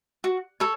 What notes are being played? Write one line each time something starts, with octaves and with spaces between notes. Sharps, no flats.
F#4
A4 C#5